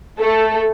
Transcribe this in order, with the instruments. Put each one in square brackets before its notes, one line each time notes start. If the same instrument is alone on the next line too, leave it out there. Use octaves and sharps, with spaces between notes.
[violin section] A3 A4